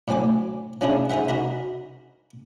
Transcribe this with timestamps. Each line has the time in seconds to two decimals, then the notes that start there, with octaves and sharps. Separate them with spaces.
0.08 A2 F#3 C4 G#5 D6
0.81 F3 C#4 D4 E4 G#4
1.10 D#4 G#4 C5 E5 F#5
1.28 D#4 F#4 A#4 B5